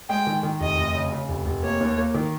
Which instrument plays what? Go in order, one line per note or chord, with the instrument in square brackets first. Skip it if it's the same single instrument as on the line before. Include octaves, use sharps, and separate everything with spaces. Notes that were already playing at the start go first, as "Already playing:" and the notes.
[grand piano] G#3 [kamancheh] G5
[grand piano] D#3
D#3
[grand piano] F1 [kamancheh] D#5
[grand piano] F1
C#3
C#3
F1
F1
[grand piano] A#3 [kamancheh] C#5
[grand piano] D#2
A#3
D#3